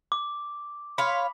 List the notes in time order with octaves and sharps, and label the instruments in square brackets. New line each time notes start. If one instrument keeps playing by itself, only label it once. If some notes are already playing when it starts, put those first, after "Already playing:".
[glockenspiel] D6
[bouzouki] C#5 F5 [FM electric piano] B5 [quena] C6